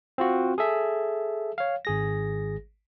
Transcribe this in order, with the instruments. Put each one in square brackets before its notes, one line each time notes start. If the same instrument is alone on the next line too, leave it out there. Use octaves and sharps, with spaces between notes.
[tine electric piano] C4 F4 F#4
G#4 A4 E5
C#5 F5
G#1 G#4 A#6